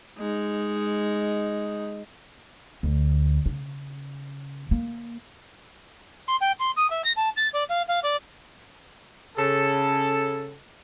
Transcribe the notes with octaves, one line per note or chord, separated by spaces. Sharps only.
G#3 D#4
D2
C#3
A#3
C6
G5
C6
D#6
E5
A#6
A5
A6
D5
F5
F5
D5
C#3 A4